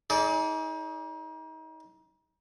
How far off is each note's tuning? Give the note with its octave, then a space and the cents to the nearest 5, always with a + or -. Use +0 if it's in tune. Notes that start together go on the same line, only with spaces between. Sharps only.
D#4 +35 G#4 +30 D5 -20